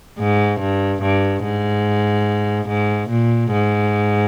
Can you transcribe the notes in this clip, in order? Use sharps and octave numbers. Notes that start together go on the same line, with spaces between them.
G#2
G2
G2
G#2
G#2
A#2
G#2